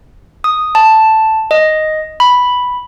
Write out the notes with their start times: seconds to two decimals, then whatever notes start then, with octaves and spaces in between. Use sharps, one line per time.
0.44 D#6
0.75 A5
1.51 D#5
2.20 B5